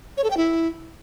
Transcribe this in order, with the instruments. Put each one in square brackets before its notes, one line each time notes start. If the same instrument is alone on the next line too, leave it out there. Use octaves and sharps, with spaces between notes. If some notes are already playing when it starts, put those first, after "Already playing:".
[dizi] C#5
A4
G5
E4